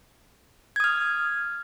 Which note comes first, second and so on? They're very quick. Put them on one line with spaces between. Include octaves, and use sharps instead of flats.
G#6 D#6 F6